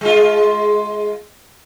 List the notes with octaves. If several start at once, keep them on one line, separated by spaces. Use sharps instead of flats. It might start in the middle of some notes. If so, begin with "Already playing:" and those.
G#3 F4